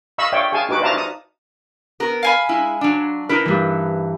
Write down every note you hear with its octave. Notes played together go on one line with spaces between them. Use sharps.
D#5 F5 B5 C#6 E6
C#5 D5 E5 F5 G5
G#4 F5 G#5 A5
D#4 F#4 B4 D6
C5 D5 E5 F5 A5 A#5
D#4 D#6
B3 A#4
F5 G#5 B5
G#3 E4
F#3 D4
D#4 E4 A#4 B4
G2 E3